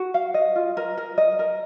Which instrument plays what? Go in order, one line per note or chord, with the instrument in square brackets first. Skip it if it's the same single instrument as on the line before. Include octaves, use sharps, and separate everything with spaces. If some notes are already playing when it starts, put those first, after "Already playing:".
Already playing: [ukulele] F#4
F5
D#5
F4
A#4
A#4
D#5
A#4